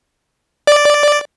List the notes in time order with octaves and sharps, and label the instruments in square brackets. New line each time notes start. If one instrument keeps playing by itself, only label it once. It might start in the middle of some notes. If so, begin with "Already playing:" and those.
[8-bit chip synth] D5